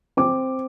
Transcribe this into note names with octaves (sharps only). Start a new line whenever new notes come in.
C4 D6